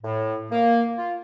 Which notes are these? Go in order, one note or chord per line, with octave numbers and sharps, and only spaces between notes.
A2
A#3
F4